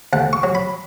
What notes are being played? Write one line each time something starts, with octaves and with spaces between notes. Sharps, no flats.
D2 F#5
C#6
F#3
B5